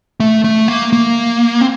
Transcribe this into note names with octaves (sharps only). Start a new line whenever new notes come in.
A3
A3
A#3
A#3
C4